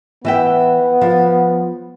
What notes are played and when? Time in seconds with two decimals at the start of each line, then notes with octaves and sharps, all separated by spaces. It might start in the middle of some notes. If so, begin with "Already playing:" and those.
0.25 E3 B3 E5 G5
1.01 F3